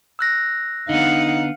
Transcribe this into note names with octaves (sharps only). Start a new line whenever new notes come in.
E6 F#6 A#6
D3 B3 D#4 F5 F#5